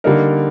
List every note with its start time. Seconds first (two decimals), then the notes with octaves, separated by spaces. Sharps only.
0.04 D3 G3 A#3 D#4 A#4